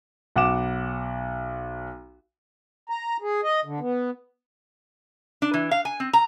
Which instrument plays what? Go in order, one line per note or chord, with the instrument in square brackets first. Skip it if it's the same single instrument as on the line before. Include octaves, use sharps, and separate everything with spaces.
[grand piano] B1 F#5 D6 E7
[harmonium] A#5
G#4
D#5
D3
B3
[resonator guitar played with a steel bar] D4
E3
F5
G#5
C4
A#5